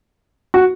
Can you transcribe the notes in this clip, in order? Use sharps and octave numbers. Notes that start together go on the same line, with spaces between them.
F#4